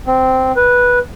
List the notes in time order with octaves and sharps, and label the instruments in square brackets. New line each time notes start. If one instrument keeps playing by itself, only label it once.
[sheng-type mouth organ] C4
B4